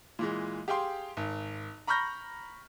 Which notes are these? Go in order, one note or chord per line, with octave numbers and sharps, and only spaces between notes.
A#2 E3 G#3
G4 G#4 F5 G5 C6
G#1
A#5 B5 C#6 F6 G6 A#6